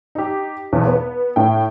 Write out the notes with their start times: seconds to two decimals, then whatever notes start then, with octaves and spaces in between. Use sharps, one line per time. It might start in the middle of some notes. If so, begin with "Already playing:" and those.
0.15 D#4 G4
0.73 B1 E2 B2
0.87 B3
1.36 A2 G5